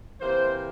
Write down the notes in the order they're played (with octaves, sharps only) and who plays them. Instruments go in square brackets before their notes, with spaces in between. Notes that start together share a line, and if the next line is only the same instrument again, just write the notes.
[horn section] C3 E3 A#3 C5